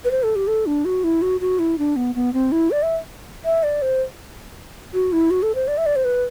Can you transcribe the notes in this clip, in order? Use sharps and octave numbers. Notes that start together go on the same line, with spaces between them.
B4
C5
A4
G4
A4
D4
F#4
E4
F#4
F#4
E4
D4
B3
B3
C4
E4
D5
E5
E5
D5
C5
F#4
E4
F#4
A4
C5
D5
E5
D5
C5
B4